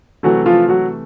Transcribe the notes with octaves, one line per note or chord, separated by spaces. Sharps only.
C3 E3 F#3 A3 F#4
F3 F4
F#3 F#4